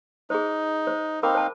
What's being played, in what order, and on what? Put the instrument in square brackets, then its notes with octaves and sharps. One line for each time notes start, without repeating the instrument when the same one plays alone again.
[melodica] D#4 [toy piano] G#4 C5
[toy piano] C5
[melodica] C4 D#4 F5 [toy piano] A#4 B5 D6
[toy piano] C5 A5